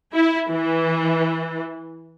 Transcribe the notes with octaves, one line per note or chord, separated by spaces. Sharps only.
E4
E3